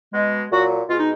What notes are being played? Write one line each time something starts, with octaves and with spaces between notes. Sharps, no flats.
B2 G#3
A#2 F#3 F#4
B2 G#3 F4
D#4